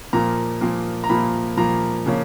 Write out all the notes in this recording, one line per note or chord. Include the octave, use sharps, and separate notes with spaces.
A#2 F3 A#3 A#5
A#2 F3 A#3
A#5
A#2 F3 A#3 B5
A#2 F3 A#3 A#5
C#3 F3 A#3 C#4